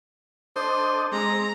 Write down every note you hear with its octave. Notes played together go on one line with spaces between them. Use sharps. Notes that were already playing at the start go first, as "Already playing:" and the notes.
D4 A4 C5 D#5
G#3 C4 A#5